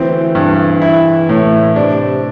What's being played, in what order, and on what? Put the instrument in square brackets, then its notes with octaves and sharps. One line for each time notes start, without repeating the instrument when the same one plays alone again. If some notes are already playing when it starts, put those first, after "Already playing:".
Already playing: [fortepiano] D2 C4 [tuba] E3
[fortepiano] G2
E4
A2
[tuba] C3 [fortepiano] D4